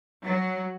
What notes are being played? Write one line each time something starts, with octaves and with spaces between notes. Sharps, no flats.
F#3